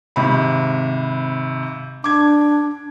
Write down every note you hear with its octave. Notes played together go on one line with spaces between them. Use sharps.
G#1 C3 B5
D4 D6 G#6